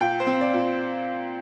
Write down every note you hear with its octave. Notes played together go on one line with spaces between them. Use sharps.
A#2 G5
C5
C4
D5
A#2